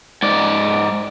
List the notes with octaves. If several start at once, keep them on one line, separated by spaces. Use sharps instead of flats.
G#2 D5